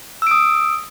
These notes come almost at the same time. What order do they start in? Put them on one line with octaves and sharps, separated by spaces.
E6 D7 D#6